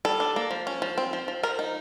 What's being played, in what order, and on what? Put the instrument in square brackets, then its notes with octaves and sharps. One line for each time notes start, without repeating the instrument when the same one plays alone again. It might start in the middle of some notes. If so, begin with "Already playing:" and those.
[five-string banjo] G3 A4
D4
A#3
F3
C#4
F3
C4
F3
F3
F3 A#4
D#4